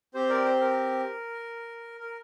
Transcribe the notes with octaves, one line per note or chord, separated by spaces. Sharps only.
C4 G4 C5
A#4 D5
C5
A#4
A#4